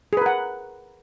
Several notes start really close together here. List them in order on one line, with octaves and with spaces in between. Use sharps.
G#4 B4 A#4 F#5